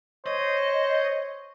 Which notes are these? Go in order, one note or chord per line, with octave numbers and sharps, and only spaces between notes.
C5 C#5 D#5